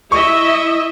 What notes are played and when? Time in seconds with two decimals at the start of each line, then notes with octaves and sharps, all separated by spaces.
0.12 E4 D#5 E5 C#6